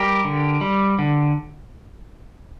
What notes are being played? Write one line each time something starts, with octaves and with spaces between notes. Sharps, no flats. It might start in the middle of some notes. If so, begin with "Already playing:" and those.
Already playing: G3 G4 A#4
D3
G3
D3